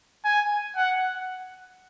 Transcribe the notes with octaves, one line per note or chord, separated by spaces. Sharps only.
G#5
F#5